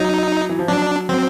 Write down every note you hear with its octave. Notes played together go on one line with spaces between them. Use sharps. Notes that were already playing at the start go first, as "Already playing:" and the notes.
Already playing: F#3 D#4
E3
F3
F#3 D4
F#3 C4